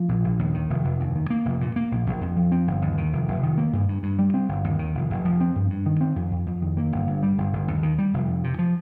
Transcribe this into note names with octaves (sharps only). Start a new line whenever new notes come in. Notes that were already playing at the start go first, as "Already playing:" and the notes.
Already playing: F3
A#1
A#1
D#2
D#3
F1
F1
D#2
D#3
A#3
F1
A#2
A#3
A#1
A#1
F2
F3
C4
G1
D#2
D#3
F1
F1
D#3
A#3
G2
G2
G2
G3
C4
G1
D#2
D#3
F1
F1
F3
C4
G2
G2
D#3
C4
F2
F2
F2
D#3
A#3
G1
G2
G3
G1
G1
D#2
D#3
G3
F1
F2
C3
F3